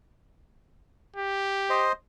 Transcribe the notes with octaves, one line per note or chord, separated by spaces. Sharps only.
G4
C5 D#5